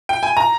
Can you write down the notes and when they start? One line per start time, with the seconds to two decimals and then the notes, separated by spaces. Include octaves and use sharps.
0.09 G5
0.23 G#5
0.37 A#5